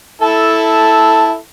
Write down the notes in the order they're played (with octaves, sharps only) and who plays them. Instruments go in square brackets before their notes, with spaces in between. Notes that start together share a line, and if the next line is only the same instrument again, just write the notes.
[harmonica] E4 A4 A5